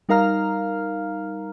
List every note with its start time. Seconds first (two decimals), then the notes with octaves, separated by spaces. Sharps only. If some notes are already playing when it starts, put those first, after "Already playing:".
0.09 G3 D#4 A#4 F5 A#5 F6